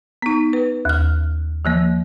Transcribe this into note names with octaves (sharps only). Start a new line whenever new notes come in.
B3 D#4
B4
D#2 F6
D#3 F3 A#3